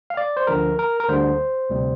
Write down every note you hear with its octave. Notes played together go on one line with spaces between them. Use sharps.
F5
D5
C5
D2 D3 F3 A#4
A#4
A#4
D2 D3 G3 C5
D2 C3 G3